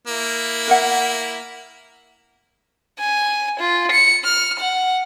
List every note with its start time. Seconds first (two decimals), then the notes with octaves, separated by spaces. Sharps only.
0.07 A#3 E4
0.68 A#4 E5 F#5
2.99 G#5
3.60 F4
3.92 C#7
4.24 F6
4.60 F#5